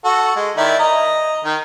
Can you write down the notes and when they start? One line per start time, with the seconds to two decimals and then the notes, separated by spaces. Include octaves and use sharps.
0.05 F#4 A4
0.36 G#3
0.57 D#3 E4 D5
0.79 D#5 A#5
1.45 D#3